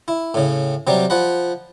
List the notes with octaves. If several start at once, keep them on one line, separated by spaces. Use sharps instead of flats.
E4
A2 C#3
C3 F#3 G3
F3 F#5 B5